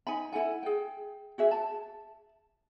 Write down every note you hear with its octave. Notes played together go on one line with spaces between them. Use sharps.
D#4 G#5 B5
E4 A4 F#5 G#5
G#4 G5
F#4 G#4 E5
A5